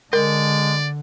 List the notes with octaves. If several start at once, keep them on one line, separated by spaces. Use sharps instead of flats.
D3 G#3 A#4 D5